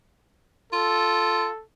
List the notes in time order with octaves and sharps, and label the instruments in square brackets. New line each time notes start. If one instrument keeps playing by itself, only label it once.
[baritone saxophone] F4 [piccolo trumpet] A4